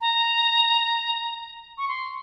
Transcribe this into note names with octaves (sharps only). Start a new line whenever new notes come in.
A#5
C#6
C6